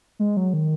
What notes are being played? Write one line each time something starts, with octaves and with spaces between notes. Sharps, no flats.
G#3
F#3
D#3